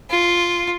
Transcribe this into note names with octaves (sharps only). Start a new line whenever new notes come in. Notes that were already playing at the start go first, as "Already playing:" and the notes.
F4